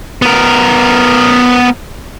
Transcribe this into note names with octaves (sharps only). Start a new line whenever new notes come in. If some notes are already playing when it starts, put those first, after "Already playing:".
B3 A#4